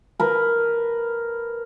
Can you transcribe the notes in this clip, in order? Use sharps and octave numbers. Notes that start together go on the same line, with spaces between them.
A#4 B4